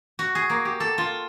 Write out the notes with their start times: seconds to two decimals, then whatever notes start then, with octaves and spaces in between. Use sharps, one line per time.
0.19 F#4
0.35 G#4
0.50 A#3
0.65 G4
0.80 A4
0.98 F4